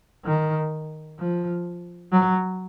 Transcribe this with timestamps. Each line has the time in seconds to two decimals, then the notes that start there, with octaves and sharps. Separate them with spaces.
0.25 D#3
1.19 F3
2.12 F#3